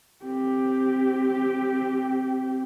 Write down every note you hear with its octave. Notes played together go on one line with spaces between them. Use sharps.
C4 G4